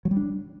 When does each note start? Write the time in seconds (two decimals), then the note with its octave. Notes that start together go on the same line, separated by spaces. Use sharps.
0.05 F#3
0.11 G3
0.17 D4